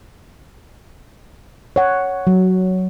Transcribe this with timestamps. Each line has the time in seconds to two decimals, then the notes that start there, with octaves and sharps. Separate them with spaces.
1.76 C#5 F#5
2.27 F#3